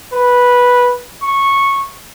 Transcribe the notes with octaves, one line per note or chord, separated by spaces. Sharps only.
B4
C#6